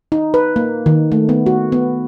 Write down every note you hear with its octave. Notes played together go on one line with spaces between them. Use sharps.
D#4
B4
A#3
D#3
A3
B3
F#4
B3